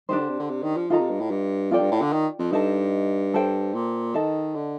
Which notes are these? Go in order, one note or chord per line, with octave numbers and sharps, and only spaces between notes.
D#3 D4 G4 C5
D3
C3
D3
C3
D#3
F3
D#3 F4 A4 D#5 A#5
C3
G2
A2
G2
F2 F4 A4 D5 G5
G2
A2
D3
D#3
F2
G2 D#4 A4 D#5 A5
A4 C5 G5
A#2
D#3 A4 D#5 A5
D3